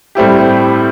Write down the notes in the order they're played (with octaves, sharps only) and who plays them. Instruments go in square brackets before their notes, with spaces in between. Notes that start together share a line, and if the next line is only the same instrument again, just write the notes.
[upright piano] A2 G3 C4 E4 G4